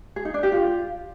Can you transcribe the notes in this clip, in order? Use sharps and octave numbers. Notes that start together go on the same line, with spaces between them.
G#4
D#4
D4
G4
F4